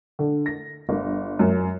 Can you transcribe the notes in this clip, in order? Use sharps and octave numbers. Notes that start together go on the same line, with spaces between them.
D3
A#6
G1
F#2